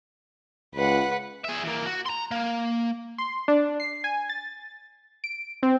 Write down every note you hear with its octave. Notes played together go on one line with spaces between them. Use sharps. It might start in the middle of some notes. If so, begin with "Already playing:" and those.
C#2 B4 F#5
G#4 E5
E2 A#3
F#4
A#5 C6
A#3
C6
D4
C7
G#5
A6
D7
C4